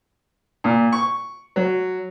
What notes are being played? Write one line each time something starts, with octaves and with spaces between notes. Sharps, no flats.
A#2
C#6
F#3